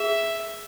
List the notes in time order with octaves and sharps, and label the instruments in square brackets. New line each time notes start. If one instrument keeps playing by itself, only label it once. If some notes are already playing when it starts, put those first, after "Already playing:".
Already playing: [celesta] G#4 [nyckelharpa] E5